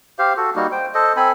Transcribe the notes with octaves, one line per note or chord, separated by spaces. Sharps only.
G4 C5 F5
F#4 A4
G3 A#3 D#4 F#4
C5 G5
A4 C5 D#5
C4 A4 G#5 B5